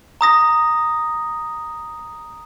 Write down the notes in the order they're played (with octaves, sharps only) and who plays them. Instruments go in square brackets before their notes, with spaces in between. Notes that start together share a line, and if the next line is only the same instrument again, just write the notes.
[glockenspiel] A#5 D#6 A#6